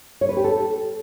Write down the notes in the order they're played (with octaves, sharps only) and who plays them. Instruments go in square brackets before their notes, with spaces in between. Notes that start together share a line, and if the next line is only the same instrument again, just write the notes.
[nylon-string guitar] C#5
B4
G4
A4